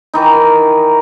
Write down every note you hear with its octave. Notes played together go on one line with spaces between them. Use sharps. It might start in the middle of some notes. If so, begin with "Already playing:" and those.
D#3 E3 D#4